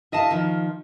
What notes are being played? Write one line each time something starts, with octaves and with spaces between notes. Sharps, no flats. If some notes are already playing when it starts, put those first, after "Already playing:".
E4 D#5 F5 A5
D#3 F3